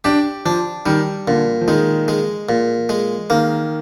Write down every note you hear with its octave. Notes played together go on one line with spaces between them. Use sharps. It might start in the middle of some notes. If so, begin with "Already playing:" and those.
D4 G4
F3 D4
D#3 G3
A#2 D3
F3
D#3 G#3
G#3
A#2
G#3
D#3 A#3